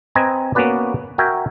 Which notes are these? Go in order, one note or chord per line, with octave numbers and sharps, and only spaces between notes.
C4 B4 D#5 G#5 A#5
A#3 B3 C#4 F#4 B4 D5
F#4 A#4 E5 G5 G#5